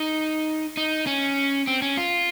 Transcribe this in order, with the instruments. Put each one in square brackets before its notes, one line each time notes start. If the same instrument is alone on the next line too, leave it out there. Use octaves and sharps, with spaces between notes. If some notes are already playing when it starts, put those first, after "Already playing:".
Already playing: [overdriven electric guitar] D#4
D#4
C#4
C4
C#4
F4